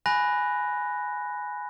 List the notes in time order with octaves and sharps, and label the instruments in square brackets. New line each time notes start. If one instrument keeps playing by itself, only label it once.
[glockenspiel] G#5 B5 F#6 A#6